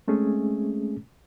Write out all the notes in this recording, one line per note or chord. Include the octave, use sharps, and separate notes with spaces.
G#3 A3 C4 C#4 G#4